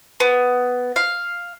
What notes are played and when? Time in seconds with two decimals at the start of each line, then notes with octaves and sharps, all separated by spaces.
0.20 B3
0.96 F5